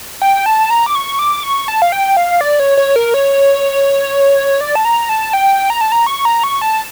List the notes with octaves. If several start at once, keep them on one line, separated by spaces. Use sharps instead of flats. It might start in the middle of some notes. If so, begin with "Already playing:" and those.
G5
A5
A#5
D6
C#6
D6
C#6
A5
F5
G5
F5
D5
C#5
C#5
A#4
C#5
D5
A5
A#5
A5
G5
A#5
A5
A#5
C#6
A#5
C#6
A5